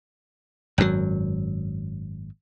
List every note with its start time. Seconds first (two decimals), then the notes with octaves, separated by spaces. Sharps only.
0.78 G#1 F#2 A#2 F#3